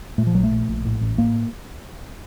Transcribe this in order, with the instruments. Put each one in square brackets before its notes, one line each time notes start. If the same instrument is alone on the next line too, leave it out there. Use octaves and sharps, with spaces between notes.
[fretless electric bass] A#2 A3
F3
A#1 F#3
A3
A#2
A#1
A2
A1
A2 A#3